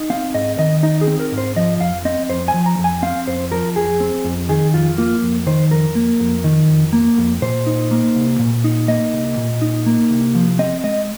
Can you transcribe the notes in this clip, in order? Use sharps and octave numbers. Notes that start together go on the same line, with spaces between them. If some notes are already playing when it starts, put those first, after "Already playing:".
Already playing: D#4
C4 F5
G#2 D#5
D#3 D#5
D#4 D#5
G#4
C4
A#4
G#2
C5
F3 D#5
F2 F5
C4 D#5
F2 C5
G#5
F3
A#5
F2
G#5
C4 F5
F2 C5
F3 A#4
F2 G#4
C4
F2
D#3 G#4
F2 F4
A#3 F4
F2
D#3 C5
F2 A#4
A#3
F2
D#3
F2
A#3
F2
A#2 C5
D#4
A#3
C2
A#2
D#4
A#3 D#5
C2
A#2
D#4
A#3
C2
F3
C4 D#5
G#3 D#5